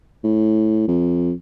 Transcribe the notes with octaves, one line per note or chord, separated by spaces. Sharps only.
A2
F2